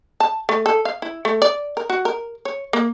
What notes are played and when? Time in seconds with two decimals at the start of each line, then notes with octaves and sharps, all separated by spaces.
0.20 A5
0.49 A3
0.66 A4
0.85 F5
1.02 E4
1.25 A3
1.42 D5
1.77 A#4
1.90 F#4
2.05 A#4
2.45 C#5
2.73 A#3